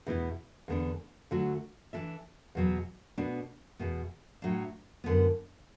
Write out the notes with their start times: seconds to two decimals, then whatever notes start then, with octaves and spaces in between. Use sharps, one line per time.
0.06 E2 B2 B3 E4
0.68 E2 D3 B3 D4
1.31 D2 D3 F#3 A3 F#4
1.93 E3 D4 A4 E5
2.55 E2 B2 F#3
3.18 B2 B3 D4 A4
3.79 E2 B2 B3
4.42 A2 F#3 D4
5.04 F#2 D3 B3